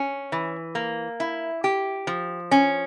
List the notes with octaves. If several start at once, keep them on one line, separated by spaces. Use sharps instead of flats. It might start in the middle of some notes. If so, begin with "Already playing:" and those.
Already playing: C#4
E3
A#3
E4
G4
F3
C#4